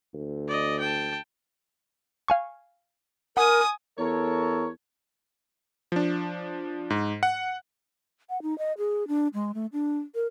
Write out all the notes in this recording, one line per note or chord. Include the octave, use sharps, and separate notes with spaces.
D2
D5 D#5
G5 A5
F5 G#5 C#6
A#4 F#5 G#5 D#6
E2 A4 A#4 C#5
F3 D4
G#2
F#5
F#5
D#4
D#5
G#4
D4
G#3
A3
D4
A#4